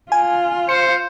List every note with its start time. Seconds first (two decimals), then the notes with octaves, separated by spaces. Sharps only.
0.12 F4 G#5
0.69 C5 C#7